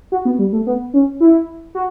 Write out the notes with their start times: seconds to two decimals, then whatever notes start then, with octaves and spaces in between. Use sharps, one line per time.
0.12 F#4
0.25 B3
0.39 G3
0.53 A3
0.67 B3
0.94 C#4
1.20 E4
1.75 F#4